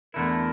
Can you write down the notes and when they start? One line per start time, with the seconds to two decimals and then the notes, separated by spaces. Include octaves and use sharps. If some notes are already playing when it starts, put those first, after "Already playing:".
0.14 E2 D3 A3 E4 A#4